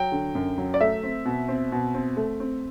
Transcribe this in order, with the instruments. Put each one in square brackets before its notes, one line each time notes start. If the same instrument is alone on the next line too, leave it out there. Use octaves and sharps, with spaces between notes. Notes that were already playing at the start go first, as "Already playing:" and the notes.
Already playing: [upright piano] F#3 G5
D3
F#2
F#3
D5
A3 E5
C4
B2
C4
B2
C4
A3
C4